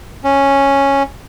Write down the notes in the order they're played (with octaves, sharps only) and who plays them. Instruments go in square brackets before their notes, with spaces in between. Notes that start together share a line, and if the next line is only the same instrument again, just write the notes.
[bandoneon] C#4